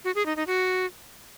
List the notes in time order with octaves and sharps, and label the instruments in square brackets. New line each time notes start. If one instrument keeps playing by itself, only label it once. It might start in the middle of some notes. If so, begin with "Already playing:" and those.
[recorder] F#4
G#4
D#4
D#4
F#4